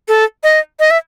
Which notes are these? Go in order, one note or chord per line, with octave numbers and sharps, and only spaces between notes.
A4
D#5
D#5
E5